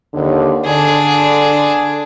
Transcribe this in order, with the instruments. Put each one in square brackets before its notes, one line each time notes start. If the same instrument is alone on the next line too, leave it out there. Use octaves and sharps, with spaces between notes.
[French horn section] D#2 D3
[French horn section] D3 [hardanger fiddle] D4 G#4